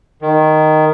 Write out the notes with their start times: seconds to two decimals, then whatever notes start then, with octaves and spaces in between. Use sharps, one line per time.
0.22 D#3